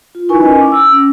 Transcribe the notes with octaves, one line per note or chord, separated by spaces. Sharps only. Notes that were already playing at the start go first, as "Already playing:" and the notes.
F4
D#4 E4 A#4 B4 G#5 C#6
C#4 D#5 G#5
D6
E6
C#4